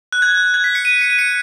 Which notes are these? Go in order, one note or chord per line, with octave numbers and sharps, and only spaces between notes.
F#6
G#6
F#6
G#6
B6
C#7
D#7
C#7
D#7
C#7